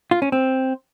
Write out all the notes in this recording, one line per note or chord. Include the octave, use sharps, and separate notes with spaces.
F4
C#4
C4